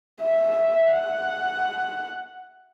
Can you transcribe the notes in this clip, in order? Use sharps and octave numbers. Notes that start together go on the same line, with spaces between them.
E5
F#5